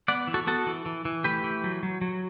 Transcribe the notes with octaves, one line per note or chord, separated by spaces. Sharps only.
B3 D5 F#5
E3
F#4 A4
B3 F#4 A4
E3
E3
E3
A3 G4 B4
E3
F#3
F#3
F#3